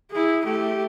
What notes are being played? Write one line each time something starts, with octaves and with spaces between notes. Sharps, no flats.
E4 G#4
A3 G4